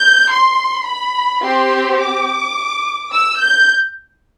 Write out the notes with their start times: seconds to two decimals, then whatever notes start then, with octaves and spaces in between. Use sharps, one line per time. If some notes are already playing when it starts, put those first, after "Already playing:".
Already playing: G6
0.31 C6
0.87 B5
1.44 C4 G4 C6
2.00 D6
3.13 E6
3.41 G6